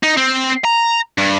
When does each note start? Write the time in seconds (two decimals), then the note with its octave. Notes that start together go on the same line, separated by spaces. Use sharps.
0.03 D#4
0.17 C4
0.65 A#5
1.18 G2